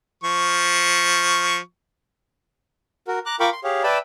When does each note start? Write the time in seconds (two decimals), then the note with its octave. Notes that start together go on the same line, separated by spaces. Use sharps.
0.24 F3 C#6
3.08 F#4 A#4
3.26 A#5 D6 F#6
3.40 F4 A#4 G5 B5 C#6 D6
3.52 C6
3.64 G4 G#4 C#5 F5
3.84 B4 D5 E5 G5 A5 B5